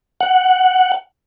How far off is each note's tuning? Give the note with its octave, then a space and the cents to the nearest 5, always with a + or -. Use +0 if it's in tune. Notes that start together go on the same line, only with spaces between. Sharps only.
F#5 +10